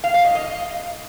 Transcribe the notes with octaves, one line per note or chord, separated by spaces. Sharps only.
F5
F5
D#5
D#5